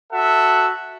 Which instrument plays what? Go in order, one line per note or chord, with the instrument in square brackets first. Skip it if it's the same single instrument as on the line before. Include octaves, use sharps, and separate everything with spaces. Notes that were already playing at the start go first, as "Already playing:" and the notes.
[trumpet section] F#4 A4 E5 F#5